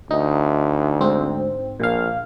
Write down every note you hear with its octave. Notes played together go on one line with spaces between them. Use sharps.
D2 D#4
G#2 C4
A#1 A#2 F5